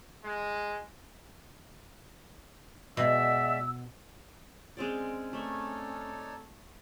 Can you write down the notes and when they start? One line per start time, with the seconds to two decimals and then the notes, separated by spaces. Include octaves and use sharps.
0.24 G#3
2.97 B2 G#3 F#4 D5 E5 E6
4.77 G#3 C4 C#4 D5
5.33 A3 D#4 A4 C#5 D5